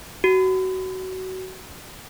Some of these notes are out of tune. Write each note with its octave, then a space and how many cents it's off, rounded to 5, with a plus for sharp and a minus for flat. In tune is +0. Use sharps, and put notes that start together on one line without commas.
F#4 +20